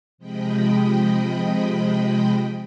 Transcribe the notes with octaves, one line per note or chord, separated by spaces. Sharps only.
C3 F3 G#3 D#5 G5 B5